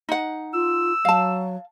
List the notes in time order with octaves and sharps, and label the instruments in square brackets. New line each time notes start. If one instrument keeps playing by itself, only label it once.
[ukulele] D#4 F#5
[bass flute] F4 [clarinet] E6
[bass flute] F#3 [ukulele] F5 A5